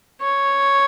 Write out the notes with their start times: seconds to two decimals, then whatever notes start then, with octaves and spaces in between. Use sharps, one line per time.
0.21 C#5